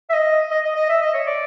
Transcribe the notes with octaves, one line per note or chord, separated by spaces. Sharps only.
E5
D#5
D#5
D#5
D#5
E5
D#5
C#5
D5